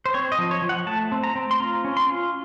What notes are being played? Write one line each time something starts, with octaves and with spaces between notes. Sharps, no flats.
C5
C4 C#5
D#5
F3
C#5
F3
F#5
A3 A5
C4
A#5
C4
C6
F4 A#5
C#4
C6
F4